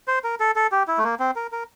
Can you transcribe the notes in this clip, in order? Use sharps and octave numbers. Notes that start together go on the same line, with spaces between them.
C5
A#4
A4
A4
G4
E4
A3
A#3
C4
A#4
A#4